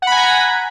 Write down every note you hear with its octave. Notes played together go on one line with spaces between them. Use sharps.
F#5 G#5 A#5 B5